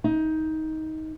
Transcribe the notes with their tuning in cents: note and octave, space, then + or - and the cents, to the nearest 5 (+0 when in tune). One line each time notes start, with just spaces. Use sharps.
D#4 +15